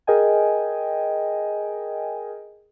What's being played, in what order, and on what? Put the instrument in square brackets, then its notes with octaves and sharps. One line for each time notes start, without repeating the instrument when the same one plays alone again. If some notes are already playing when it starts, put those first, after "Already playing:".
[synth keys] G#4 A#4 D#5 G5 G#5